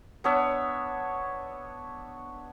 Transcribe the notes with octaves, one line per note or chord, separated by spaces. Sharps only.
B3 D4 C#5 E5